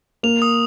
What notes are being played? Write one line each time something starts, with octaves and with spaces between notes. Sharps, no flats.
A#3 F7
D#6